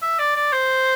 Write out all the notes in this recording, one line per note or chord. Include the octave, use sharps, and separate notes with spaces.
E5
D5
D5
C5